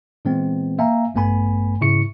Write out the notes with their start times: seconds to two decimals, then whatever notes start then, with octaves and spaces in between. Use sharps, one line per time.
0.25 A#2 E3 G#3 B3 C4
0.78 A#3 E5 F5 G#5 A#5
1.14 A1 G2 A3 B3 G#5 B5
1.81 G#2 C#3 E4 C#6 C#7